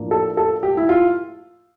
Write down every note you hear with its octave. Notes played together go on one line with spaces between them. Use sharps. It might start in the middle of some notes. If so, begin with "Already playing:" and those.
Already playing: A2 F3 A#3 D4
A4
A4
G4
E4
F4